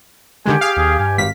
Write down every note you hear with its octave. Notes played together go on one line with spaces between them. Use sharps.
D3 D#3 G#3 G4 G#5
G#4 F5
D#2 G#4
G2 G#5
G#1 F5 B6